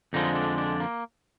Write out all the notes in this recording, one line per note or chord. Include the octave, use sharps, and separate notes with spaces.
F2 D3 F3 G#3 D#4
D4
D4
A#3